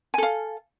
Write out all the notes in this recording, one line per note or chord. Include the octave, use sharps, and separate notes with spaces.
A4 F5 G#5